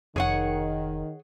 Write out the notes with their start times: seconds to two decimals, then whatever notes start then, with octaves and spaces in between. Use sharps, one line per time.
0.16 F1 D#3 G#4 C#5 F#5